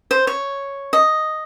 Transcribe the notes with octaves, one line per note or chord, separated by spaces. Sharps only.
C5
C#5
D#5